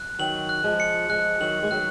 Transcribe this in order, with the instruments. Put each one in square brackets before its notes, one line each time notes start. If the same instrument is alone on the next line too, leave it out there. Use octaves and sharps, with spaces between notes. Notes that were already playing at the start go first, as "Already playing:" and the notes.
Already playing: [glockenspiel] F#6
[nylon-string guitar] D#3 F#3 [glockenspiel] F#7
[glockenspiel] F#6
[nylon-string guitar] F3 G#3
[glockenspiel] C#7
[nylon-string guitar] F3 G#3 [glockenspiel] F#6
[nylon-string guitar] D#3 F#3 [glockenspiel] F#7
[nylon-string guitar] G#3
[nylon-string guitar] D#3 F#3 [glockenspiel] F#6